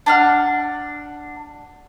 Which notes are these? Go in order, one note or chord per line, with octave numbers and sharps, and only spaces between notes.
D4 F#5 F6